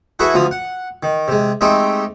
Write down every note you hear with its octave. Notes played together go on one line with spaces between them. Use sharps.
E4 F#4 G#4 A4 B4 E5
D2 F3 F5 D#6
F#5
D#3
C3 G#3
G#3 A3 C4 D#4 G4